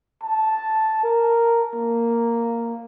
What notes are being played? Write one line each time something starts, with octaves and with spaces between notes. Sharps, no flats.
A5
A#4
A#3